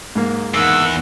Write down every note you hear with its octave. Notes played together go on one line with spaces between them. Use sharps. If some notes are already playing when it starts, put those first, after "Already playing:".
G#2 G#3 A#3
E2 D#3 F#5 E6